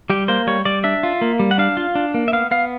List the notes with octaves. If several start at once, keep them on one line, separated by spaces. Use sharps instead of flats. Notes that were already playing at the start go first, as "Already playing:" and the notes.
G3 G4
A#3 C5
G3 C#5
G3 D5
D4 E5
F4
A#3
G3
F#5
D4 F5
F4
D4
A#3
E5
B3 F5
B3 F5